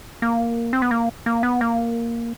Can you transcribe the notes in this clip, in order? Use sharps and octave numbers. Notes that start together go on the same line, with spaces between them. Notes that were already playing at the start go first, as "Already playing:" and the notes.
A#3
C4
B3
A#3
A#3
B3
A#3